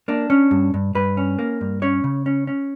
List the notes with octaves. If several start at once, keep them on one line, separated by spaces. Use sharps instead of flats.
A#3 D4
C#4
G2
G2
G2 B4
C#4
A#3
G2
C#4 C#5
C#3
C#4
C#4